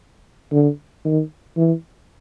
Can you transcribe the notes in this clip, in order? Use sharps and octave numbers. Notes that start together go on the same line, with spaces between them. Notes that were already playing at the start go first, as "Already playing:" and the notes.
D3
D#3
E3